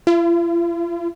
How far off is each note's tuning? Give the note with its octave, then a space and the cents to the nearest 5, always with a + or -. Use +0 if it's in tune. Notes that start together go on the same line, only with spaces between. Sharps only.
F4 -45